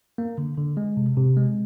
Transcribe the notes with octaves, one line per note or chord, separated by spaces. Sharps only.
A#3
D3
D3
G#3
C3
C3
G#3